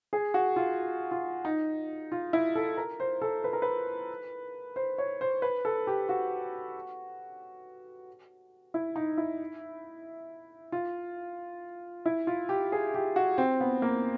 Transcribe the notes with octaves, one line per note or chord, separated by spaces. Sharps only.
G#4
F#4
F4
F4
D#4
F4
E4
A4
A#4
C5
A4
B4
A#4
B4
C5
C#5
C5
B4
A4
G4
F#4
E4
D#4
E4
F4
E4
F4
G4
G#4
G4
F#4
C4
B3
A#3